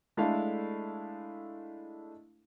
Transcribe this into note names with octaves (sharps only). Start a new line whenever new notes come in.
G#3 A3 D4 E4 A4 F5